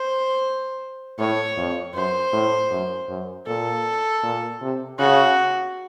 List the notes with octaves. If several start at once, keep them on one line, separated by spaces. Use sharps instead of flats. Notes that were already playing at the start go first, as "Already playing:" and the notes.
Already playing: C5
A2 C#5
F2
F#2 C5
A2
F#2
F#2
A#2 A4
A#2
C3
C#3 F#4